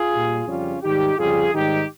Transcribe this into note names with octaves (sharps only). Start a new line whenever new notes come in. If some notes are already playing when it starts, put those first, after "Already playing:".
Already playing: F4 G#4
A#2 G3
F2 C#3 G3 C#4 F4
G#2 D#3 G3 D#4 G4
F2 C#3 G3 F4 G#4
G#2 D#3 G3 D#4 G4